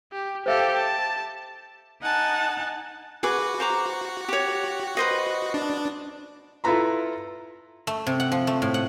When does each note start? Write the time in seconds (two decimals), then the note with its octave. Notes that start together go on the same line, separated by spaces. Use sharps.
0.13 G4
0.46 G4 A4 C5 E5 F5
0.76 A5
2.02 D#4 F#5 G#5 A5
3.23 F#4 G#4 B4 D6
3.60 C5 A#5 D6
4.28 G4 C#5
4.97 B4 C5 D#5
5.54 D4
6.64 E4 F4 A4 B4 A#5 B5
7.87 A3
8.07 C3
8.20 F#5
8.32 F3
8.47 A3
8.62 A2
8.74 F#5